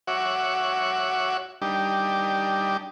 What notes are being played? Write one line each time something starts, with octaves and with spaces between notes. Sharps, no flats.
F#4 C#5 E5 F#5 D6
G3 D4 D#4 G4